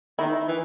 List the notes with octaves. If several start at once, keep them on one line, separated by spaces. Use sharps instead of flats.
D#3 E4
E3